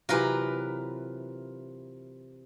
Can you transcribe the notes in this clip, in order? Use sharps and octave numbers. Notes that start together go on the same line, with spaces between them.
C3 E3 F#3 F4 A#4 B4